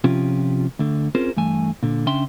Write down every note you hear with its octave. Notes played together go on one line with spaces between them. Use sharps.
C3 F3 C#4 F4 G4
D2 D3
C4 C#4 F4 G#4 A#4 C5
G2 E3 A3 G#5
A#2 D3
C#3 C#4 D4 E5 G5 C6